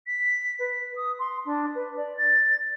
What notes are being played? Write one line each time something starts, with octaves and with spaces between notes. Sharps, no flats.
B6
B4
D#6
C6
D4
B4
D5
A6